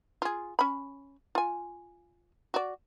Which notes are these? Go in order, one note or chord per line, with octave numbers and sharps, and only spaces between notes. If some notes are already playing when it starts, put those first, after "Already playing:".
F4 G#4
C#4 B5
F4 G#5
F#4 D5